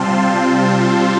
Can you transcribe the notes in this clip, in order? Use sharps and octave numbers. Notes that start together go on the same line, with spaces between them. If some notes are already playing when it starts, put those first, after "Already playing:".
Already playing: C3 G3 C4 F4 A5 C6